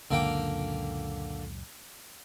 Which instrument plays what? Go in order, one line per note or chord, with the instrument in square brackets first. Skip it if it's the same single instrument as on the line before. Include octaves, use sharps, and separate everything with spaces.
[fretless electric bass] C#2 F#2 A#2 [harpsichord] D3 A#3 G5